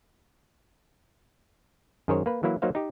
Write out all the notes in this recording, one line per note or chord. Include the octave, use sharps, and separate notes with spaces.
F#2 D#3 G#4 A#4 C5 C#5
A#3 B4
E3 F#3 A#3 E4
F#3 A#3 D#4 C5 F5
D#4 G4